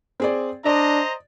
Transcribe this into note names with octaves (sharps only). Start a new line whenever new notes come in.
C4 G#4 D5
D4 C5 D5 D#5 A#5